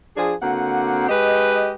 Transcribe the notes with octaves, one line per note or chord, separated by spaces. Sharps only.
F3 D4 G#4
D3 A#3 C4 F#4 F#5
G#3 G4 B4 D#5